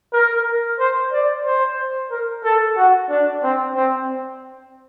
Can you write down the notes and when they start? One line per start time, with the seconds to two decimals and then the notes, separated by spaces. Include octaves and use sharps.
0.13 A#4
0.79 C5
1.12 D5
1.45 C5
2.11 A#4
2.44 A4
2.77 F#4
3.10 D4
3.43 C4
3.76 C4